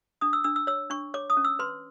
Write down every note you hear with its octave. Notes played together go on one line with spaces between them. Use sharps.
D4 D#6
E6
D4 E6
E6
C#5 E6
D4 C#6
C#5 D6
D#6
C#4
E6
B4 C6